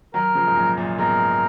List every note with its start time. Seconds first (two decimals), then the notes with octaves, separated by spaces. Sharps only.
0.14 D#3 F#3 A#4
0.35 C#3 F3
0.47 G#2
0.56 F#2 A#2
0.77 F#2 A#2
0.99 G#2 B2 A#4